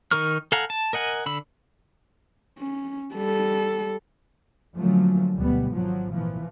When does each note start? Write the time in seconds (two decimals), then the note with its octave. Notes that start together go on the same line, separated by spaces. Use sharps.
0.11 D#3 D#4 A#4 C#6 F6
0.52 A4 F5 F#5 G#5 A#5
0.70 A5
0.93 A#4 D#5 F#5 G#5
1.26 D3 B5 E6
2.59 C#4
3.14 G3 A4
4.76 D3 F3 F#3 A3 A#3 C#4
5.38 D2 B2 G3 B3
5.73 G#1 G#2 F3 F#3
6.12 A#2 E3 F3